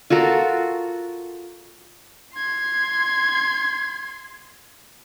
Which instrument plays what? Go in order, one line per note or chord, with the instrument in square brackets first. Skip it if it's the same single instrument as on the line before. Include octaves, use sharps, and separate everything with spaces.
[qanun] F4 F#4 A4 A#4
[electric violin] C6 G#6